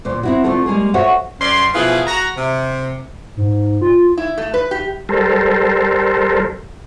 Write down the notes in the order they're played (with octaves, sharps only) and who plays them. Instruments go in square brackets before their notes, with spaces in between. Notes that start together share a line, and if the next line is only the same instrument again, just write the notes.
[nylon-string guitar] D2 A#2 C5
C4 E4 F#4
D3 A3 C4 F4 A4
G3 G#3 A#3 G#4
F#4 A4 C5 C#5 E5 F#5
[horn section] F#2 C#4 D5 C6
B2 E3 F3 E4 F4 G#4
F#4 A#5
C3
[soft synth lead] G#2
F4
[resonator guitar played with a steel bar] E4
A3
B4
G4
[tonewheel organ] G3 A4 A#4 C5